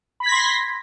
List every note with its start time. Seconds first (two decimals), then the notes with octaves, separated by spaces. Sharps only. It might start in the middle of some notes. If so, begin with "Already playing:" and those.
0.20 B5
0.23 B6
0.26 G#6
0.29 A#6
0.32 C6